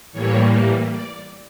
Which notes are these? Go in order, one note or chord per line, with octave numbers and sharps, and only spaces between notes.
A2 E3 G3 A#3 C#5
D5